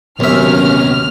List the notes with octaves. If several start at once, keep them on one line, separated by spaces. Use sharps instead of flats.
D#2 C3 F#3 A#3 B3 C#4 E5 F6